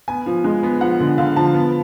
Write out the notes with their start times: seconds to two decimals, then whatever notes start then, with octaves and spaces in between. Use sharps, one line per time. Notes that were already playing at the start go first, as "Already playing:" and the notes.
0.08 B3 G#5
0.26 F3
0.44 G#3
0.63 B3
0.81 F3 F#5
1.00 D3
1.18 D3 F5
1.36 F3 A5
1.54 B3